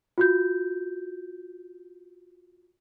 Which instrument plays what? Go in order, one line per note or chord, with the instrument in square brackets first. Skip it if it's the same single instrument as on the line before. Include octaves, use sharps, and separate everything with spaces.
[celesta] F4 F#4 G6